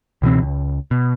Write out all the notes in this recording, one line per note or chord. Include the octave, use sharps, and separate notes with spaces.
C#2 B2 E3 C4
C#2
B2